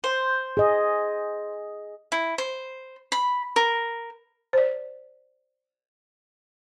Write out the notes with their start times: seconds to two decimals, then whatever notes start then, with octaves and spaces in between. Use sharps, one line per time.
0.04 C5
0.57 G#4 D#5
2.12 E4
2.38 C5
3.12 B5
3.56 A#4
4.53 C5 D5